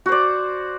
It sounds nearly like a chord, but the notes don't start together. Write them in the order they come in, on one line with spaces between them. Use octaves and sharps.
F#4 C5 D5